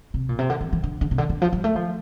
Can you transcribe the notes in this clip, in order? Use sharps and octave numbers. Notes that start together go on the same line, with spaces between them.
C3
A#2
C3
D3
E3
E3
D3
D3
C3
D3
D3
F3
G3
A3
F3